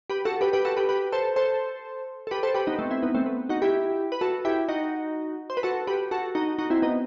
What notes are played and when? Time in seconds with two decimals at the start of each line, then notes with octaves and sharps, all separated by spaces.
0.10 G4 B4
0.25 F#4 A4
0.41 G4 B4
0.53 G4 B4
0.65 F#4 A4
0.77 G4 B4
0.89 G4 B4
1.12 A4 C5
1.36 A4 C5
2.27 A4
2.31 G4 B4
2.43 A4 C5
2.54 G4 B4
2.67 B3 D#4
2.79 A3 C4
2.90 C4 E4
3.03 B3 D#4
3.14 A3 C4
3.26 B3
3.49 D#4 F#4
3.62 E4 G4
4.12 B4
4.21 F#4 A4
4.45 E4 G4
4.68 D#4 F#4
5.50 C5
5.57 B4
5.63 F#4 A4
5.87 G4 B4
6.11 F#4 A4
6.35 D#4 F#4
6.59 D#4 F#4
6.70 C4 E4
6.82 B3 D#4